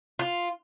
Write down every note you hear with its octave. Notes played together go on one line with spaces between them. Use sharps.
F4